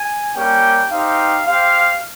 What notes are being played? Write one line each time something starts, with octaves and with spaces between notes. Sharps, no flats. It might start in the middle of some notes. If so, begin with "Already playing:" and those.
Already playing: G#5
G3 A#3 C#4 G4 G5
C4 D#4 G4 F5
C4 G4 F5